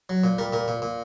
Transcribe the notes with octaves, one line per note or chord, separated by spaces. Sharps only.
F#3
A#2
G3 A#4
A#2 A#4
A#2
A#2